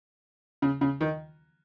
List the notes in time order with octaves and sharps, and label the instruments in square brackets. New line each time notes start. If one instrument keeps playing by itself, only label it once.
[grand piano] C#3
C#3
D#3